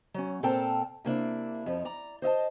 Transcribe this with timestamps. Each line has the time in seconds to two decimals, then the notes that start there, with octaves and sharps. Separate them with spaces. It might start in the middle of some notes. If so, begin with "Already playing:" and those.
0.14 F#3 C#4
0.43 A#2 C4 A4 A#4 G5 A5
1.05 C3 A#3 D4 E4
1.66 F2 F3
1.85 D5 A#5
2.22 C5 D#5 E5 A5